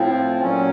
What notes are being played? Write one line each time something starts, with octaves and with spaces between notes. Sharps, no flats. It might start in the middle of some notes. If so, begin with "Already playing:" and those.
Already playing: A2 F3 C4
A#2 F#3 C#4